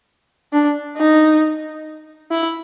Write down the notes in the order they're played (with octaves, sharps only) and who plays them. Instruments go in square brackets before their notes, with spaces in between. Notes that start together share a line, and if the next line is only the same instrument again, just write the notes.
[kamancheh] D4
D#4
E4